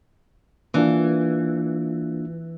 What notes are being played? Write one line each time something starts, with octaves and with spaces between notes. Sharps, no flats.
E3 A#3 D4 F4